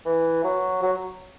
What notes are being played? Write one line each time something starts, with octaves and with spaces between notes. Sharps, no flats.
E3
F#3
F#3